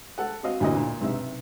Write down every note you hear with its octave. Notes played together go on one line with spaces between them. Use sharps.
A4 F#5
C4 F#4 D#5 F5
A1 D2 F#3 A#3 E4 D#5
A#2
B1 C3 D#4 E5